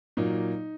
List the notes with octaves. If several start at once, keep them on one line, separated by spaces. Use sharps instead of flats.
A#2 F#3 A#3 D#4